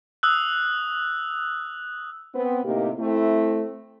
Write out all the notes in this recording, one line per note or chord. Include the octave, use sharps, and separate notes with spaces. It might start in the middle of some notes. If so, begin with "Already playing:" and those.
D#6 E6 F#6
B3 C4
A2 C3 A#3 D#4 G4
A3 C4 E4